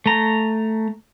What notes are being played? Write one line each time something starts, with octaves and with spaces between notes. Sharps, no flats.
A3 A#5